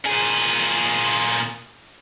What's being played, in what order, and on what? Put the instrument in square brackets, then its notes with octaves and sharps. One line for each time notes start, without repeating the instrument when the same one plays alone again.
[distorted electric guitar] A#2 G#4